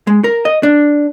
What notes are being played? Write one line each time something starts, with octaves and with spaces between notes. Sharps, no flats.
G#3
A#4
D#5
D4